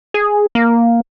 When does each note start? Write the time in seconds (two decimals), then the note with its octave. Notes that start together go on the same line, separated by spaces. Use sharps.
0.14 G#4
0.55 A#3